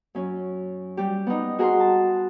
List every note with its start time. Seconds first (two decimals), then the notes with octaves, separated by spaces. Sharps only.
0.15 F#2 C#4
0.97 G3 G4
1.27 B3 D#4
1.59 F#4 G#4 A#4 C6
1.80 A5